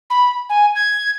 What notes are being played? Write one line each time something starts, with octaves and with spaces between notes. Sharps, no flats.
B5
G#5
G#6